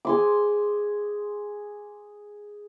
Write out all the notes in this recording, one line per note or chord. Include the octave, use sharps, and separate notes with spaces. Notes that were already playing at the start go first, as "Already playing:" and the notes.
G#4 C6 D6